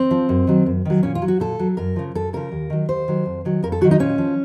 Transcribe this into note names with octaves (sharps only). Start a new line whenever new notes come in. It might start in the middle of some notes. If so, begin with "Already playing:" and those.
Already playing: C4
F3
F#2
D#3 F#3
F#2
D#3 F#3
A#2 C#4
F4
F#3
F#4
A#2 A4
F#3
F#2 A#4
C#3 F3
F#2 A4
C#3 F3 A#4
D#2
D#3 F#3
D#2 C5
D#3 F#3
F2
D#3 F#3
F2 A#4
A4
D#3 F#3 F#4
D#4
A#2 C#4
F3